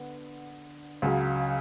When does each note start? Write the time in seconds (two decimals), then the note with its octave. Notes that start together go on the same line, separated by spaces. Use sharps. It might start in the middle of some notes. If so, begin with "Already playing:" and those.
Already playing: D3 B3
1.02 C#2 C#3 F#3